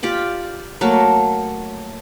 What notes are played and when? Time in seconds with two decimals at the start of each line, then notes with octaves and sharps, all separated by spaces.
0.03 F4 G4 D5 G5
0.81 F#3 A3 A#3 F5